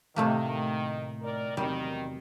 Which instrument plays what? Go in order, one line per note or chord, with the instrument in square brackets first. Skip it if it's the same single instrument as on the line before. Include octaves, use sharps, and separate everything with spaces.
[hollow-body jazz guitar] A2 E5 [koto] C3 A3 A#3 [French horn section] D#3
[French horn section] D#3 A#4 D5
[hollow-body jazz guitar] E2 C3 F#3 [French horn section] D#3 [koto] G3